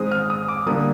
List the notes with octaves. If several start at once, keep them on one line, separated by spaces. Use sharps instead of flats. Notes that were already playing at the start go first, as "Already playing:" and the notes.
Already playing: D#3 G#3 C4 D#6
F6
D#6
D6
D3 G3 A#3 D#6